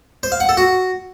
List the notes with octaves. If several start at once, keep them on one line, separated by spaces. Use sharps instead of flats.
C5
F5
F#5
A4
F#4